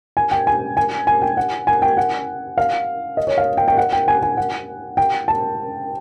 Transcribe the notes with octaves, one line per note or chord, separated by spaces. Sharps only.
G#5
G5
G#5
G#5
G#5
G5
F#5
G#5
G5
F#5
F5
D#5
C#5
F5
G5
G5
F#5
G5
G#5
G#5
F#5
G5
A5